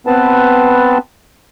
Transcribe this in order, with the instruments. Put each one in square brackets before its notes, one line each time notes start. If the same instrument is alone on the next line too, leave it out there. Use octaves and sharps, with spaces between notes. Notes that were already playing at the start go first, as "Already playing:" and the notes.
[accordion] B3 C4 B4 A5